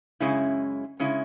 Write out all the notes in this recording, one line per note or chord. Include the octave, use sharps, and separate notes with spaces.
F#2 C#3 G#3 C#4 E4
C#3 G#3 C#4 E4